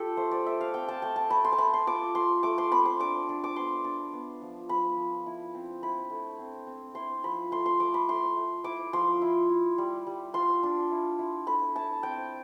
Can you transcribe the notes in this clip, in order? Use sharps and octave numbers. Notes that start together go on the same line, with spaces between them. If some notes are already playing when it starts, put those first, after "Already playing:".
Already playing: F4 G4 A4
A3 C5
D5
A3 E5
F5
C4 G5
A5
A3 G5
A5
A3 B5
C6
A5
A3 B5
C6
F4 D6
A3 C6
A3 D6
C6
C4 B5
C6
D4 D6
D4
D6
B3 C6
D4
B3
F3
F3 B5
F3
E4
C4
E4 B5
A3
C4
C4
E4 C6
F3 B5
A3 C6
C6
A3 D6
B5
A3 C6
A3
E4 D6
F3 C6
E4
E4
G3
G3
F4 C6
D4
E4
E4
A3 B5
E4 A5
C4 G5